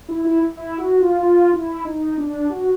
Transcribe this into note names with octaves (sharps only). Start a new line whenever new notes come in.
E4
E4
E4
F#4
F4
F4
E4
D#4
D4
F#4